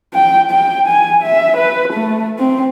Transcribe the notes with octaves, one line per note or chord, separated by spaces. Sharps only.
G5
G5
G#5
E5
B4
A3
C4